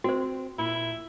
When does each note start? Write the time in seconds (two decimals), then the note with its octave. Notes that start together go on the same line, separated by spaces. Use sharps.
0.04 C4 F#4 C5
0.58 A#2 E4